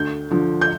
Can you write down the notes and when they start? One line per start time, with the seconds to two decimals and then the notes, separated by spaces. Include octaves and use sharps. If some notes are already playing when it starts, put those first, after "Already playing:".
Already playing: D2 G6
0.31 D3 F3
0.61 G6